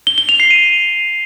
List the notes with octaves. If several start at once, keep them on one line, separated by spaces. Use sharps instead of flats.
G7
G7
F7
C7
D#7